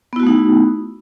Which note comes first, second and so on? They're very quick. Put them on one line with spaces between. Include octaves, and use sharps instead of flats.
B3 E4 F#4 A3 D#4